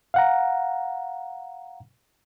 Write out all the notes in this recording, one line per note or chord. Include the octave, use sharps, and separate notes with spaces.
F5 F#5 A#5